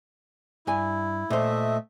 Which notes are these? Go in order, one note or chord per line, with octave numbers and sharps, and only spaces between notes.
G2 E4 G#5
A#2 A3 C5 D#5 E5